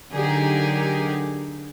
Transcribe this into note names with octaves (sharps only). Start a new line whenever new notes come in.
D3 F#3 D#4 G4 G#4 A#4